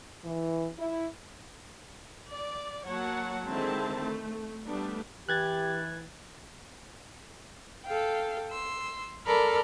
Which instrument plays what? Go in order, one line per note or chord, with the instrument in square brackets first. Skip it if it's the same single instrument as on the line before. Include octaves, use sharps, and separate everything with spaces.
[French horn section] E3
E4
[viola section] D5
F#3 A#3 F#4 C#5 F#5 A5
D3 D#3 G#3 C4 E4 A5
A3
G3 A3 B3 D4
[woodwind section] E3 [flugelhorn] G4 [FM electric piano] F#6 G#6 A6
[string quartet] A4 F5 G5
C6 E6
A4 A#4 D5 B5 F6